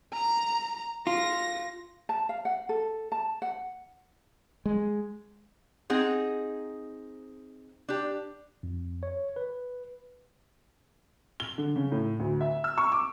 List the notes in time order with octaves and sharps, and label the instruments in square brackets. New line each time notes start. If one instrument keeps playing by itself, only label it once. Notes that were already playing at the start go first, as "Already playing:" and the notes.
[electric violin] A#5
[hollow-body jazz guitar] F4 [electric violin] A#6
[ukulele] A5
F5
F#5
A4
A5
F#5
[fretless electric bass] G#3
[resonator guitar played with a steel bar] C4 D#4 G#4 F#5
D4 G4
[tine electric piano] F2
C#5
B4
[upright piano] G7
D3
C#3
A2
D2
E5
E6
C#6
D6